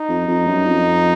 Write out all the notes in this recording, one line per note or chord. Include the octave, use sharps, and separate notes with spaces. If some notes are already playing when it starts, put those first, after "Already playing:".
Already playing: D#4
F2
F2
F#2
F2